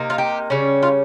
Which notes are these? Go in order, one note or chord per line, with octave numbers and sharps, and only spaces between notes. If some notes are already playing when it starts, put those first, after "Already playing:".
Already playing: C3 A#3 D#4
F4
G4
C#3 G3 C#4
F4